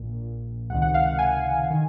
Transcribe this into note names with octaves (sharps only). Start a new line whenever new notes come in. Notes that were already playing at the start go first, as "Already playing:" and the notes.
Already playing: A#1 A#2
C#2 C3 D#3 F#5
F#5
F5
F#5
G#5
D#3